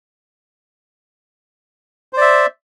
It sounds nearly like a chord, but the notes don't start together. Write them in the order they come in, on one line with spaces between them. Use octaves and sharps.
C5 D5 E5